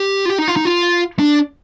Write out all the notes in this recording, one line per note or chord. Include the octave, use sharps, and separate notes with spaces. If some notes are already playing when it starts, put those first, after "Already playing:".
Already playing: G4
F4
G4
D#4
F4
D#4
F4
D4